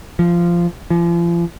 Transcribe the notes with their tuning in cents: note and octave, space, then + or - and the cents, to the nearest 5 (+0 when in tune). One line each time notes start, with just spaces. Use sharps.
F3 -15
F3 -40